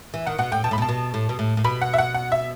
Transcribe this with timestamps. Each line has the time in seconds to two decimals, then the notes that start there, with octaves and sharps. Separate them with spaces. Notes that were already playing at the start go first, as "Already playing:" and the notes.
0.14 E3
0.26 D#3 F#5
0.38 B2 F#5
0.52 A2 G5
0.64 B2 A5
0.71 A2 B5
0.78 B2
0.82 A5
0.89 B2
1.14 A2
1.29 B2
1.39 A2
1.57 A2
1.64 B2 B5
1.82 F#5
1.94 E5
1.98 F#5
2.14 F#5
2.32 E5